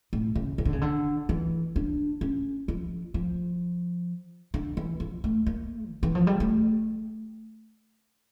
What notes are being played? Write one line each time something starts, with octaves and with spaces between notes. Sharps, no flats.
A2
C#3
C#3
D3
C#3
D3
E3
D4
C#4
F3
F3
D3
E3
F3
A3
A#3
D3
E3
F3
G3
A3